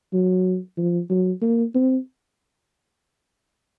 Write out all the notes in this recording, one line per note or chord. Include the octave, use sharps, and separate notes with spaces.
F#3
F3
F#3
A#3
C4